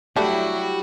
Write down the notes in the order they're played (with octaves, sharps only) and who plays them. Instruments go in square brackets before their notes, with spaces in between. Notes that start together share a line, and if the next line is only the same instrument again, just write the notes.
[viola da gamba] F#3 E4 G4 [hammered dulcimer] G3 [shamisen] A3 D4 [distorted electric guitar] F#4